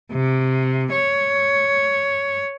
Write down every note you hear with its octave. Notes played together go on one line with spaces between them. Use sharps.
C3
C#5